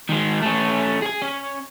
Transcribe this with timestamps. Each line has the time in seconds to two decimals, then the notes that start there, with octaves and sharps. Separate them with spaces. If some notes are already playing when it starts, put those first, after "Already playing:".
0.10 D#3 G#3
0.43 A3 C#4
1.02 G#4 G#5
1.22 C#4